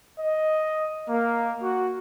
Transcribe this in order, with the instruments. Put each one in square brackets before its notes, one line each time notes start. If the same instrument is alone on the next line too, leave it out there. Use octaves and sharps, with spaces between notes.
[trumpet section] D#5
A#3
F#4